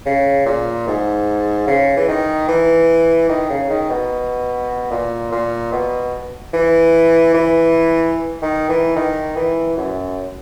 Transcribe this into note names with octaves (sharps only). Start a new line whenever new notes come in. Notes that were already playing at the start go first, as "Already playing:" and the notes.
C#3
A#2
G#2
C#3
E3
D#3
E3
D#3
C#3
D#3
B2
A#2
A#2
B2
E3
E3
D#3
E3
D#3
E3
F#2